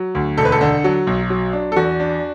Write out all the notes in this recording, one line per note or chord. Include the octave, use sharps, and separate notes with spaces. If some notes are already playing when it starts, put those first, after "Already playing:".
Already playing: F#3
D2
E1 A4
B4
A4
D3
F#3
B1
F#3
D4
A4
E2 F#4
D4